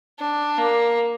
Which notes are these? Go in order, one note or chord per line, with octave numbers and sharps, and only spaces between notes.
D4
A#3